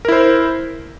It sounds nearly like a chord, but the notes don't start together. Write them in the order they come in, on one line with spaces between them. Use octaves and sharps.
A#4 E4 C5